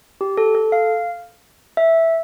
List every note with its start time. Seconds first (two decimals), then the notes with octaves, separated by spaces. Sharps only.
0.21 G4
0.37 A4
0.55 A4
0.72 F5
1.77 E5